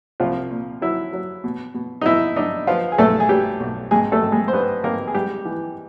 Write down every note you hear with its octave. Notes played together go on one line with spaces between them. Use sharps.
C2 F3 F4
A#2
F#3 E4
F#3
B2
B2
D#4
B2 E4
D4 D#4
F3 B3 F4
G#4
B1 A3 A4
G#4
F#3 G3 G4
B1
G#1 G#3 G#4
A3 A4
G#1
G#3 G#4
C5
G2 B3 B4
G#1 A#3 A#4
G#4
G3 G#3 G4
E3